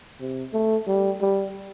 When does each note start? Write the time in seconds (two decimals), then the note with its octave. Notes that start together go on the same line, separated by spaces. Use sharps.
0.20 C3
0.53 A3
0.87 G3
1.21 G3